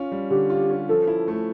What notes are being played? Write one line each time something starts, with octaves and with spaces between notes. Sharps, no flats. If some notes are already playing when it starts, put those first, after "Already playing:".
Already playing: C#4 F4
G3
D3 G4
F4
C#4
F3 A4
E4
A3